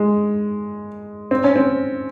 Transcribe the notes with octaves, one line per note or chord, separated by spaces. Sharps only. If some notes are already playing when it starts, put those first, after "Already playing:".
Already playing: G#3
C4
C#4
C4